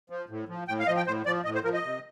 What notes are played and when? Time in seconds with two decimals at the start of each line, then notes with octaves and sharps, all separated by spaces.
0.10 F3
0.29 A2
0.48 F3
0.68 A2 G5
0.79 F5
0.87 F3 D#5
0.97 G5
1.06 A2 C5
1.26 F3 D5
1.45 A2 D#5
1.55 C5
1.64 F3 A#4
1.74 D#5
1.84 C3